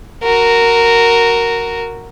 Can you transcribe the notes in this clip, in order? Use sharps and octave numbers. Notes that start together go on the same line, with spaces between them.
F#4 A#4